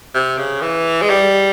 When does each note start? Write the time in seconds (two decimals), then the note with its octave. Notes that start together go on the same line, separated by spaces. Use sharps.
0.14 C3
0.38 C#3
0.61 E3
1.02 G#3
1.10 G3